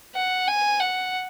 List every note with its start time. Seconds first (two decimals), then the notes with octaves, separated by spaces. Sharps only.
0.15 F#5
0.48 G#5
0.80 F#5